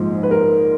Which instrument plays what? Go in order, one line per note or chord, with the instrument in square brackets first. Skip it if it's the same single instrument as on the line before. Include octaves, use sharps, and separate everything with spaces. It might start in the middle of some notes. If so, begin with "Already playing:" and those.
Already playing: [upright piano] A#1 G#2 F3 G#3
B4
A#4